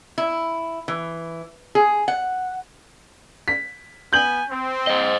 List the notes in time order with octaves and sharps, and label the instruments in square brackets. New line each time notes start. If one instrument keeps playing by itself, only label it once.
[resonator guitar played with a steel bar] E4
E3
G#4
F#5
[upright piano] B6
[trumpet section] B3 G#5 [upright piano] G6 F#7
[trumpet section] C4
[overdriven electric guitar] C5 D#5